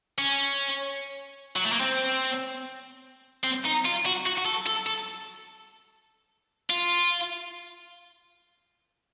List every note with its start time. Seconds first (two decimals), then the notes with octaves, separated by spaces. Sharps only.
0.18 C#4
1.56 F#3
1.65 A3
1.72 A#3
1.81 C4
3.44 C4
3.65 D#4
3.85 F4
4.06 F#4
4.26 F#4
4.38 F#4
4.45 A4
4.66 A4
4.86 A4
6.70 F4